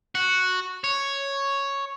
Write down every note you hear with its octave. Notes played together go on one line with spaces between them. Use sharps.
F#4
C#5